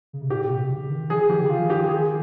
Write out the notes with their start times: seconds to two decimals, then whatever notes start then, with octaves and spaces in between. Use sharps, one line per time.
0.13 C#3
0.21 C3
0.30 A#2 G4
0.41 A#2
0.50 C3
0.70 C#3
0.90 D#3
1.10 F3 G#4
1.29 D#3 G4
1.41 C#3
1.50 D#3 F4
1.59 F3
1.69 D#3 G4
1.89 G#4